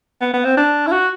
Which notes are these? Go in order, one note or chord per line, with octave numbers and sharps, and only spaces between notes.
B3
B3
C4
D4
E4
F#4